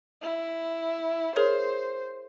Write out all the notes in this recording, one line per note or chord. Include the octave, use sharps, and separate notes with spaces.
E4
G#4 A#4 C5 C#5